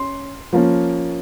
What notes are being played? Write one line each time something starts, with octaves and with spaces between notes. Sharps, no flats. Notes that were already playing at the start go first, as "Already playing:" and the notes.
Already playing: C#4 C6
F3 A#3 C#4